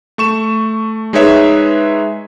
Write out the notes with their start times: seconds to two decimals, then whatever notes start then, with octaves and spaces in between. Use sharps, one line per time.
0.18 A3 C#6 E7
1.13 G#3 D#4 G#4 B4 C#5 E5